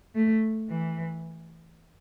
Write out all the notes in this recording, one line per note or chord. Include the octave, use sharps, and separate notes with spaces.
A3
E3